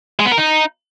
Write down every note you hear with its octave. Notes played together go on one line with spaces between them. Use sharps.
G#3
B3
A#4
D#4